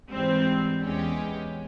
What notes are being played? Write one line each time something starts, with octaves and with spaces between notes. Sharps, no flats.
G#2 E3 G3 C4
E2 E3 G#3 C#4 G4